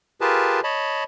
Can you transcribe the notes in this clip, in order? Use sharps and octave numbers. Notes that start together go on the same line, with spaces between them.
F4 G4 G#4 A#4 B4 A5
C#5 D#5 A5 B5